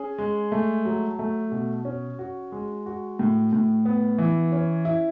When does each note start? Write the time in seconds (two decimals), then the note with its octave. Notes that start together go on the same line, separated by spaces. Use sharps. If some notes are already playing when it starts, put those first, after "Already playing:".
Already playing: C#4 G#4
0.18 G#3
0.52 A3
0.85 F#3
1.19 A3
1.52 B2
1.85 C#4
2.19 F#4
2.52 G#3
2.86 F#4
3.19 A2
3.53 A2
3.85 B3
4.18 E3
4.52 C#4
4.85 E4